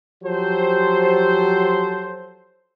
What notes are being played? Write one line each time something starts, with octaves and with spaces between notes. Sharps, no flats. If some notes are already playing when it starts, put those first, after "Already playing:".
F3 F#3 G4 A4 C5